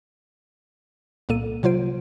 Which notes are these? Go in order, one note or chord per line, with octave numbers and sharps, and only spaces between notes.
C2 A#2 A#3 A4 D#7
C3 F#3 F4 C5 D7